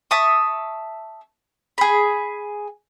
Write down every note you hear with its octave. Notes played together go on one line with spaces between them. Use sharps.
E5 A5 C#6 D#6
G#4 B5